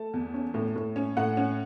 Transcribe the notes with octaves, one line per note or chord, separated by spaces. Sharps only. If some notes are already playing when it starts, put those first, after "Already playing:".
Already playing: A3 A5
E2
C#4
A2
A2
C#4
A2 F#5
C#4